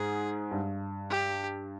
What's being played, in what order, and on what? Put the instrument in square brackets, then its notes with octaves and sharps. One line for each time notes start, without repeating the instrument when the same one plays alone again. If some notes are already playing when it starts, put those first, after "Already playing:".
Already playing: [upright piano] G#2 [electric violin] G#4
[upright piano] G2
[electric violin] G4